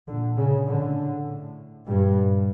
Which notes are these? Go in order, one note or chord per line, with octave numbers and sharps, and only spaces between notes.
A#2 D3
C#3
A2 D3
A2
G2 A#2 G3